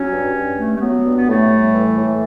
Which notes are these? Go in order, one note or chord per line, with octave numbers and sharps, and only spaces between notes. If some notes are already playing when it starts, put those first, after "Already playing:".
Already playing: F#3 C#4
G2
G2
A3
A3
F#3 B3
G2
B3
A2 A3
G3
E3
A2
A3